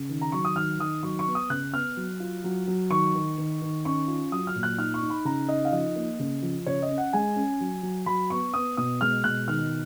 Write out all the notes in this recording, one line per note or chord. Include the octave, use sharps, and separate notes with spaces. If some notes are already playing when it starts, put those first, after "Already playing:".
Already playing: C#3
D#3
A#5
F#3 C#6
D#6
D#3 F6
D#3 D#6
F#3 C#6
C#6
B3
D#6
C#3 F#6
B3 F6
F#3
F4
F#3
F#3
D#3 C#6
D#3
D#3
D#3
C#4 C#6
F4
F#3 D#6
F6
A#2
F#6
D#4 F6
C#6
D#4
B5
C#3 A#5
D#4 D#5
F5
F3 D#5
A#3
C#3
F3
C#3 C#5
D#5
C#4
F#5
G#3 G#5
C#4
F#3
F#3
F#3 B5
B3 C#6
B3 D#6
B2 D#6
G#3 F6
B2 F#6
D#3 F6